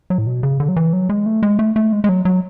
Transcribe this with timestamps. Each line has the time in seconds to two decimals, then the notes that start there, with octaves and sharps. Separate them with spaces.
0.10 F#3
0.18 A2
0.27 B2
0.43 C#3
0.60 D3
0.69 F#3
0.76 E3
0.93 F#3
1.09 G#3
1.26 A3
1.43 G#3
1.59 A3
1.76 A3
1.92 G#3
2.04 G#3
2.09 F#3
2.25 F#3